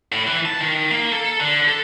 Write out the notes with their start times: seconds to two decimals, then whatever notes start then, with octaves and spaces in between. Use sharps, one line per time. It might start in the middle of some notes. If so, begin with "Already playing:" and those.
0.12 A2
0.27 E3
0.45 A5
0.61 D#3
0.91 A#3
1.12 A4
1.40 D3
1.68 A4